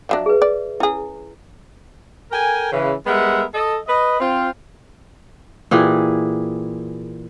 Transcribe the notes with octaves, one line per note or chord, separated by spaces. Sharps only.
F3 F#3 D4 D#5 E5
G#4 B4
D5
C#4 E4 G#4
A4 A#4 G5 G#5
C#3 E3 B4
G3 G#3 B3 A#4 E5 F#5
A4 D#5
B4 D#5
C4 F4 G5
A#2 E3 G4 G#4